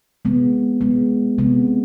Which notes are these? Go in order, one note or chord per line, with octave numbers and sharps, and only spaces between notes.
C3 G#3 B3
C3 G#3 B3
C3 G#3 B3